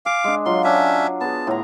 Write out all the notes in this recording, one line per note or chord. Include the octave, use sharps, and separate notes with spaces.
F5 G#5 D6
G#3 D4
F#3 F4 C6
C#4 D4 E5
B3 G#4 A5
A2 D3 A#5